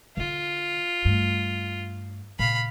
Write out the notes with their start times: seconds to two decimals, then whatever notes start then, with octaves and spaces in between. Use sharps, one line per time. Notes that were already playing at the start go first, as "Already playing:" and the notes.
0.17 D3 D4 F4
1.05 G2 A3
2.39 A#2 C#3 F5 B5